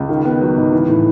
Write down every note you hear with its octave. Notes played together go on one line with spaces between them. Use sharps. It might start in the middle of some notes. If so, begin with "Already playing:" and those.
Already playing: C#2
D#3
B3
F#3
G#2
E3
A2